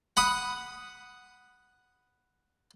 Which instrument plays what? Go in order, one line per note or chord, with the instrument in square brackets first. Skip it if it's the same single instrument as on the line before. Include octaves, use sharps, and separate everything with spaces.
[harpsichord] F#5 B5 D#6